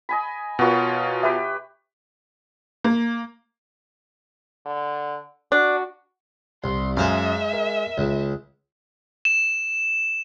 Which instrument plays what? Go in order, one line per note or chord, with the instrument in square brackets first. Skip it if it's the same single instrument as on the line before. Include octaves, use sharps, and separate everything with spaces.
[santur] D#5 G#5 B5
[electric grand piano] B2 F4 [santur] F#4 A#4 C#5
[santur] G4 B4 G5 [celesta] E5
[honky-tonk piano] A#3
[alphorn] D3
[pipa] D4 [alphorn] F#4
[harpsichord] C2 [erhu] C6
[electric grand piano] F#2 [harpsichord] G#3 C5 F5 [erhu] E5
[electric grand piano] A#4
[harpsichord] C#2
[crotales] E7